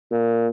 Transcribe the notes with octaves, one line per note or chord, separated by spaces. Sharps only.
A#2